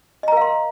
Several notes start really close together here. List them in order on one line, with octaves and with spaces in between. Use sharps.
D#5 A#5 A#4 F5 C6